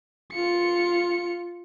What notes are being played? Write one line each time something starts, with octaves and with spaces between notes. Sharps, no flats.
F4 C#7